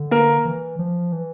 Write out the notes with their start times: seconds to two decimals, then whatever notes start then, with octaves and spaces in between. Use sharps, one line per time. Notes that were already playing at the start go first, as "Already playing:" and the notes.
Already playing: D3
0.11 A#3 A#4
0.45 E3
0.79 F3
1.12 E3